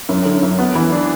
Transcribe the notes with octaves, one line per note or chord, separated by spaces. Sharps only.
F#2
D3
F#2
B3
E3
D4